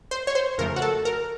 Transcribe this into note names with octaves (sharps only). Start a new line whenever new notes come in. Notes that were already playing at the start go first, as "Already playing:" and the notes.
C5
C#5
C5
F2 C#3 F3 A3 A#4
F#4
A4
A#4